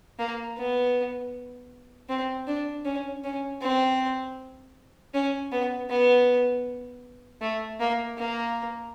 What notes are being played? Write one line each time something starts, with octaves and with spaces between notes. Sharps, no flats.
A#3
B3
C4
D4
C#4
C#4
C4
C#4
B3
B3
A3
A#3
A#3